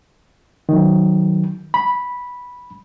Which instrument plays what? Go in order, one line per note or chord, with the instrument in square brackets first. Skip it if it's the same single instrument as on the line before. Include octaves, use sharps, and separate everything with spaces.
[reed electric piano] D#3 F#3
B5